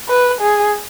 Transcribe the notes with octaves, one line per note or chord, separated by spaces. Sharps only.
B4
G#4